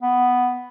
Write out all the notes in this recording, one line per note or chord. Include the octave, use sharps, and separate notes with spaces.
B3